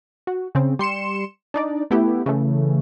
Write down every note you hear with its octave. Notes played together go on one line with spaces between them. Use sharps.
F#4
C#3 C4
G3 C6 C#7 E7
D4 D#4 D5
A3 B3 E4 G4
C#3 E3 A3